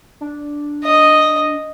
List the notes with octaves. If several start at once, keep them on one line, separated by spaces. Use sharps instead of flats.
D4
D#5